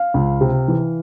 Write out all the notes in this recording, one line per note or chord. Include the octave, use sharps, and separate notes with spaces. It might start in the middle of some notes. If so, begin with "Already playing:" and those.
Already playing: F5
C#2
C3
E3